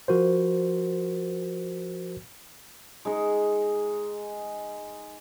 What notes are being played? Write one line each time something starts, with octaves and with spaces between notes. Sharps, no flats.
F3 F#4 A#4 C5
G#3 D#4